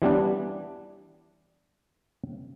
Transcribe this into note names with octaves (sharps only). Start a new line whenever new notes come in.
E3 G3 B3 D4